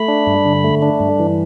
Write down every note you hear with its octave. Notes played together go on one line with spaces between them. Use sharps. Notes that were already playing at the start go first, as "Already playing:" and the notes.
Already playing: A3 B5
D4
G2
D3
A3
D4
G2
E3